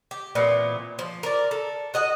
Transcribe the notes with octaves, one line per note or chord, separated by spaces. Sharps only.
G4
A#2 E3 B3 C4
F3
A#4 D5
A4
F#4 D#5 F#5